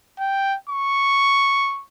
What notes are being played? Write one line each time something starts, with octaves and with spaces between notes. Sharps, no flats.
G5
C#6